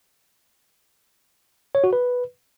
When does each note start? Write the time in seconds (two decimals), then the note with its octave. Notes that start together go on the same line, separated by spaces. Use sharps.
1.75 C#5
1.84 F#4
1.93 B4